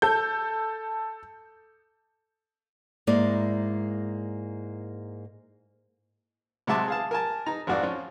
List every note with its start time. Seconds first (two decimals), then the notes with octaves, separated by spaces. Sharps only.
0.02 A4 G6
3.07 G#2 G#3 A#3 E4 D5
6.67 C3 G#3 F#4 E5 A5 D6
6.88 G#4 F5 A5
7.11 A#4 G#5 A5
7.46 D#4 A#5
7.67 G#1 F2 F#4 D5 F5
7.83 F3 C#4 F4